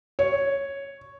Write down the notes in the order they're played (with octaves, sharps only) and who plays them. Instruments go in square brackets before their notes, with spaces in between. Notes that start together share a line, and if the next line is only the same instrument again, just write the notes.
[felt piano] C#5